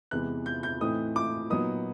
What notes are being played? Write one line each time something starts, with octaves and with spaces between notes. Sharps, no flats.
E2 C3 E3 G#3 B3 F#6
G6
G6
A2 E3 A3 C4 D#4 D#6
D6
A#2 F#3 B3 D#4 D#6